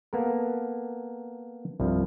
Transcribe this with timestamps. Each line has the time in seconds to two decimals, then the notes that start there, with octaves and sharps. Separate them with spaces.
0.13 A#3 B3 A4 A#4
1.80 C2 G2 F3